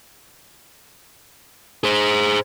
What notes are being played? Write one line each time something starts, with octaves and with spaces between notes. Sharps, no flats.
G#4 C5